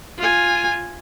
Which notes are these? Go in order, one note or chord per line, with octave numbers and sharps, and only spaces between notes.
F4 G#5